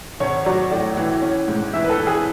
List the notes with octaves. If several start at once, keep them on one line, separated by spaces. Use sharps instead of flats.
G#1 C#5
F#3 D5
A2 D5
E3
C#4
G#2
E3 E5
B4
A4
E3
G#4